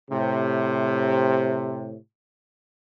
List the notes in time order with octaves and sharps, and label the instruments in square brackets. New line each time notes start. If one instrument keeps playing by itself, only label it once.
[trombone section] A2 C3